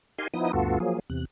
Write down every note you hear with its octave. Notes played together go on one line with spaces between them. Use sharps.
D#4 G4 A#4 F5 G#5 C6
F3 B3 D#4 E4 D#6
D2 G2 B3 F4 F#4 A4
F3 F#3 A#3 G#4
E2 C3 F#6